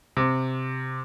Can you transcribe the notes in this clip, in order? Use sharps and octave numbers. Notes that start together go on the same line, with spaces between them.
C3